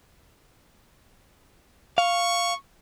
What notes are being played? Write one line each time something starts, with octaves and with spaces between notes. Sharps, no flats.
F5 C#6